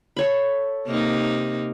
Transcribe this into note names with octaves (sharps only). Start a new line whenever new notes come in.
A4 C#5 B5
C3 A#3 D#4